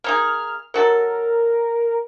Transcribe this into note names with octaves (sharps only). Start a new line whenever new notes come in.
A#3 D#4 G#4 F6
F#3 F#4 A4 A#4